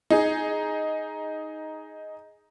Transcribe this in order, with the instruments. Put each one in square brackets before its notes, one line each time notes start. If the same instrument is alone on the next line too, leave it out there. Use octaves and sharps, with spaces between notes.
[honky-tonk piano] D#4 G#4